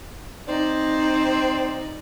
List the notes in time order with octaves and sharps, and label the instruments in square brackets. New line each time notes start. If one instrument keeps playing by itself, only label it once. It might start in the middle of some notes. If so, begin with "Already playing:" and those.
[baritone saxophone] C4 [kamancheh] D#4 D5